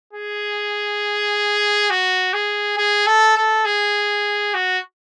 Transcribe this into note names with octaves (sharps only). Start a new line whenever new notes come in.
G#4
F#4
G#4
G#4
A4
A4
G#4
F#4